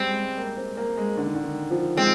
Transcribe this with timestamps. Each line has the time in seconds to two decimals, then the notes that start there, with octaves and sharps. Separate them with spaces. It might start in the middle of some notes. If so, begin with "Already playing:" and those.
Already playing: G3 G#3 C4
0.10 G#3
0.37 A#3
0.57 C4
0.77 A#3
0.97 G#3
1.17 D3
1.25 D#3
1.35 D3
1.44 D#3
1.71 F3
1.97 G#3 C4